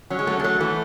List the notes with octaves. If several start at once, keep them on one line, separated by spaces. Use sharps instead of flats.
F#3 C#4
G#3
F#3 A3
G#3
F#3 A3
E3 A3